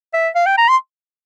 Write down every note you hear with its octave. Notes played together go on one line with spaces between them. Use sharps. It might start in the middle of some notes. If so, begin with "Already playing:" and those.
E5
F5
G5
A#5
C6